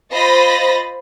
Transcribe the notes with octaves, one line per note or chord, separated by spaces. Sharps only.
F4 C5 D#5 B5 A6 A#6